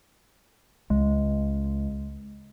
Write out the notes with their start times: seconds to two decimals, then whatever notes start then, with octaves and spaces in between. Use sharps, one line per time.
0.90 C#2 G#3